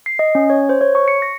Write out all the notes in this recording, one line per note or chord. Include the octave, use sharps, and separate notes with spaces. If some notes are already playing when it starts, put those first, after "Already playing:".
C7
D#5
C#4
C#5
C5
C#5
C#6
C#7
A#6